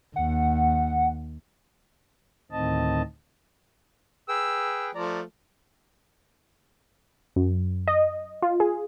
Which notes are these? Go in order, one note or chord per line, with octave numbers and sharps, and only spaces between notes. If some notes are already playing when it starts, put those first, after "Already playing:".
D#2 F#5
D2 A2 D#3 C4 D#5 A5
G#4 B4 G5 E6
F3 A3 D5 A#5
F#2
D#5
F4
G#4